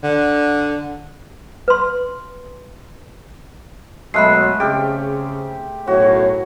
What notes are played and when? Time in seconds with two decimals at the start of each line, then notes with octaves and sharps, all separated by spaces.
0.03 D3
1.68 B4 C6
4.14 B2 F#3 G#3 A3 B5 F#6 C7
4.60 C#3 C4 G4 G#4 F6
5.87 B1 F#2 A2 F#4 C#5